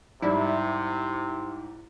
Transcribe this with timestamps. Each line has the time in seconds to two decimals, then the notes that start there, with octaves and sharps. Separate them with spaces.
0.22 G#2 C3 G3 E4